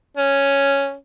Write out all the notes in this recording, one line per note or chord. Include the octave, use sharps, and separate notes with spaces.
C#4